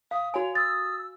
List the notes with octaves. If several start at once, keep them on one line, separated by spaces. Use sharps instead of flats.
F5 D#6
F#4 C#5 G#5
D#6 E6 A6